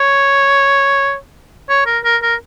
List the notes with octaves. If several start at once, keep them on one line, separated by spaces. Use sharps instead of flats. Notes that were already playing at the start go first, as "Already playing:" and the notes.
Already playing: C#5
C#5
A#4
A#4
A#4